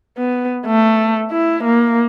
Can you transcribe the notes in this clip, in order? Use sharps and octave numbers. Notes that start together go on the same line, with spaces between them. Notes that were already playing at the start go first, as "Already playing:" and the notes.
B3
A3
E4
A#3